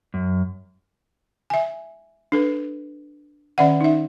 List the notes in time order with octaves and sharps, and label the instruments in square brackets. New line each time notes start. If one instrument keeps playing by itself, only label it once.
[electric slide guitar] F#2
[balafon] E5 G#5
D4 A4 B4
D#3 C#4 D5 E5 F#5
D#4 E5